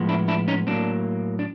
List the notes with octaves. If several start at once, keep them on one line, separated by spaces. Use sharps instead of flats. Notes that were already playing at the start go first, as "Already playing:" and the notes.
Already playing: A2 F3 G#3 B3
D4 E4
D4 E4
C#4 D#4
A2 F#3 A#3 C4 D4
D4